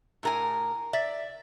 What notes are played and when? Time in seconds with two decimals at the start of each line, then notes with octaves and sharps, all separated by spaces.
0.23 A2 A#4 G#5
0.93 D5 E5